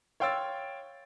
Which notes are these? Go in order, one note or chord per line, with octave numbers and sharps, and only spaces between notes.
C#5 F5 G5 C6 E6 A6